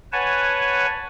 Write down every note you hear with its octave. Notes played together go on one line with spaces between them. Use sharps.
B4 C#5 F#5 G#5 A5